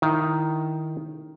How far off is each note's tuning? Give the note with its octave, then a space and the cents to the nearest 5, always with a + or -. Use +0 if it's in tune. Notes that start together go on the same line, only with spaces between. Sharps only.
D#3 +0 E4 +0